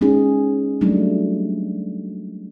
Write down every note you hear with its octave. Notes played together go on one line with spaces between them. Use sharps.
G#3 C#4 D#4 G#4
F#3 G3 A3 D4 D#4